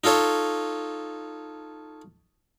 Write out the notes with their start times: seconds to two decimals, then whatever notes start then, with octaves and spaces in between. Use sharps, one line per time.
0.04 D#4 F4 A4 C#5